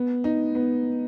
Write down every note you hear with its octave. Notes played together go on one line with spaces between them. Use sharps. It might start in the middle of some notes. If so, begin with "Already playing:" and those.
Already playing: B3
D#4
B3